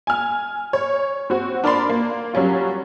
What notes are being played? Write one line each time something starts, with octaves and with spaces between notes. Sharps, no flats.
G#5 F6
C#5
C4 F#4
D4 A#4 D5 B5 C6
A#3
F#3 G3 C#4 F4